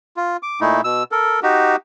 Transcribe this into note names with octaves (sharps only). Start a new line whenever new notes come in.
F4
D6
A#2 A3 D#4 E4
B2 E6
A4 A#4
D#4 F#4 G4